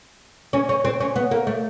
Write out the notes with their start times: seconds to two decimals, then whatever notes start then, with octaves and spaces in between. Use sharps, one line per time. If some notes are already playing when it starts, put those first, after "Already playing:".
0.53 C#4
0.69 C#4
0.85 C4
1.00 C#4
1.16 B3
1.31 A#3
1.47 A3